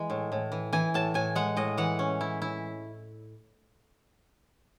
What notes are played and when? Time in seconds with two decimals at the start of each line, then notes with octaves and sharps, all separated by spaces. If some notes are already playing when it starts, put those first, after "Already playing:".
Already playing: E3 G#3
0.10 A2
0.32 A2
0.52 E3
0.73 E3 G#5
0.94 A2 A5
1.14 A2 G#5
1.36 G#3 F#5
1.57 A2 D#5
1.78 E3 F#5
1.99 C#4
2.21 E4
2.42 E4